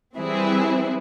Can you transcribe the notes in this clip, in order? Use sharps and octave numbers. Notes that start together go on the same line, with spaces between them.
E3 G3 C4 E4 G#4